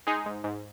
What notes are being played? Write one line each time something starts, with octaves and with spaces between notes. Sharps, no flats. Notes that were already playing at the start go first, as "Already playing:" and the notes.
G#3 D#4 G#4
G#2
G#2